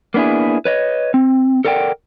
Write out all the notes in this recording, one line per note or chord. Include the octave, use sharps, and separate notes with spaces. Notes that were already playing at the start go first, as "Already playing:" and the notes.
A#3 B3 D4 E4 G#4
B4 C#5 D#5
C4
A4 A#4 D5 F#5 G5